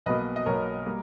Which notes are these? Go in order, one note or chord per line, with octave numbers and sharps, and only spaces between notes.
B1 B2 A#3 B4 D#5
D#5
B1 B2 A#3 A#4 C#5
G3 A#3